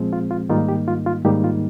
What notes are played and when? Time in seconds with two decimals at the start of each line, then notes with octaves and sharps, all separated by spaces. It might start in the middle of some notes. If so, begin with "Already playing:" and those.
Already playing: A#2 F3 G#3 C4
0.13 F4
0.31 F4
0.49 G#2 D#3 G3 A#3 D#4 F4
0.69 G4
0.88 F4
1.06 F4
1.25 G#2 D#3 G3 A#3 D#4 G4
1.44 F4